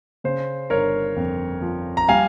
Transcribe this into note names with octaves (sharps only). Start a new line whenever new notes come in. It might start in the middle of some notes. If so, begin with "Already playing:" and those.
C#3 C5
G1 A#4 C#5
F2
F3
A#5
G3 F5 G#5